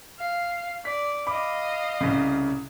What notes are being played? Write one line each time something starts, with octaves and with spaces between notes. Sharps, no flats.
F5
D5 B6
D#5 F5 B5 D6
C2 C#3